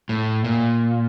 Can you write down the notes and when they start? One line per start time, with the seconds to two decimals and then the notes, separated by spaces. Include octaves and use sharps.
0.09 A2
0.44 A#2